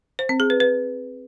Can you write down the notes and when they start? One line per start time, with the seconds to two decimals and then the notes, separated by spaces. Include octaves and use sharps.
0.19 C5
0.29 C4
0.40 G#4
0.50 B4
0.60 B4